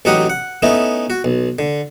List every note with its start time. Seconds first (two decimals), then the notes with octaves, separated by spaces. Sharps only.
0.05 A1 F#3 D#4 G4 F#5 D#6
0.30 F#5
0.62 A3 B3 C#4 D#4 E4
1.10 F#4
1.24 B1
1.59 D3